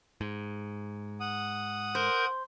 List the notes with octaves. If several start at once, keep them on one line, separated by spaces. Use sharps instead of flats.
G#2
F#5 D#6
A#4 C5 G6